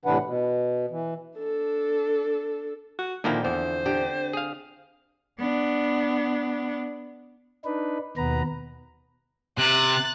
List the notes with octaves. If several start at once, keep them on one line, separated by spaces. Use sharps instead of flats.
A2 C3 E3 D4 B4 F#5
B2
E3
D4 A4
F#4
A#2 D3 D#3 F3 A#3 C4 E4
E2 C5
D3 G4
G#4 F5
B3 D4
D4 D#4 B4
D#2 B2 B3 B4 A#5
C3 F#6 A6